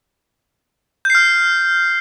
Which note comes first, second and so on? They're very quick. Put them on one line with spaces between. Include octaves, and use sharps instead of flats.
G6 C7 F6